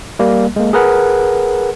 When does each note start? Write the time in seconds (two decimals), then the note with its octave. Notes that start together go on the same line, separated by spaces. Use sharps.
0.19 G3 A#3
0.56 G#3 A#3
0.73 G#4 A#4 B4 F#5